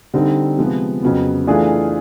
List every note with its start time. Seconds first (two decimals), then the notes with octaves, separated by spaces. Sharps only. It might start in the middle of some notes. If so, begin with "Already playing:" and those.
0.14 D3 G3 C4 D#4
0.58 C3 F3 G#3 B3
1.02 F2 C#3 F#3 B3
1.47 E3 A3 D4 F4 G#4